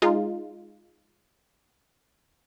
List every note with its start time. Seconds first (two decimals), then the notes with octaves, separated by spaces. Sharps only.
0.02 G#3 D#4 F4